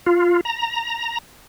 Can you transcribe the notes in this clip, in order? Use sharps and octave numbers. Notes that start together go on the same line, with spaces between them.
F4
A#5